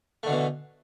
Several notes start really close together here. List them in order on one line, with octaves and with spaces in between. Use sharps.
A3 D3 B2 E3